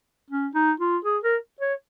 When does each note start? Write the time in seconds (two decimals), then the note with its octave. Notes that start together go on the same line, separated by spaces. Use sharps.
0.30 C#4
0.54 D#4
0.80 F4
1.05 G#4
1.23 A#4
1.60 C#5